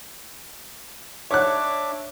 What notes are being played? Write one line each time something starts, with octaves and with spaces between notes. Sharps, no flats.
D4 C#5 E5 D6 F#6